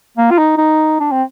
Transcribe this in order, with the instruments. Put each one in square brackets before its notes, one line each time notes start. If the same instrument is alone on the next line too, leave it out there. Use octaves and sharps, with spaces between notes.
[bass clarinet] A#3
F4
D#4
D#4
D4
C4